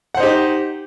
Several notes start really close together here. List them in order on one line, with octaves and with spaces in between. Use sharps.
F#5 C5 D#4 G4